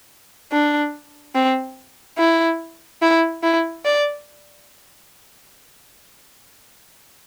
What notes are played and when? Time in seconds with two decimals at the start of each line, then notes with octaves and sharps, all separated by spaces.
0.52 D4
1.35 C4
2.18 E4
3.02 E4
3.43 E4
3.85 D5